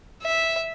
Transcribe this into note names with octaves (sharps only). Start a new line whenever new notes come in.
E5